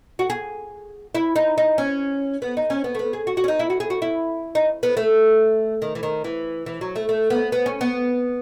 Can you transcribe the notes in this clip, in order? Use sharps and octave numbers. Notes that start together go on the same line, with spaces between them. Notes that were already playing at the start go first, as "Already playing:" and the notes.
F#4
G#4
E4
D#4
D#4
C#4
B3
D#4
C#4
B3
A3
B3
G#4
F#4
F#4
C#4
D#4
E4
F#4
G#4
F#4
E4
D#4
B3
A3
D#3
E3
D#3
E3
E3
F#3
A3
A3
B3
B3
C#4
B3